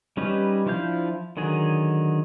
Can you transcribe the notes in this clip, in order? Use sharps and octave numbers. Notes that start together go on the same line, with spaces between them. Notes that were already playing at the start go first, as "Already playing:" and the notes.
G3 C#4 D#4 G4 B4
F3 D4 E4 F5 G6
D3 D#3 F#3 G#4